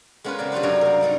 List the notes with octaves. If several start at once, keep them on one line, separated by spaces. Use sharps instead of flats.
G#3 B3 C#4 F4 A#4 B4
C#3 C4 D5
G3 D4 F4 G4 B4
F#2 C3 D4 F#4 C#5 A#5
A#3 A#4
G2 B3 D#4 D5